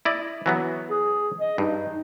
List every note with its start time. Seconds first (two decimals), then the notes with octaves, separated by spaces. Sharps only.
0.05 E4 D5 D#5
0.46 E3 F#3 B3
0.91 G#4
1.41 D#5
1.58 G2 D#4